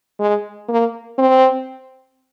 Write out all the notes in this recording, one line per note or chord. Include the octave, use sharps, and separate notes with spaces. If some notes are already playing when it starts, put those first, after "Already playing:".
G#3
A#3
C4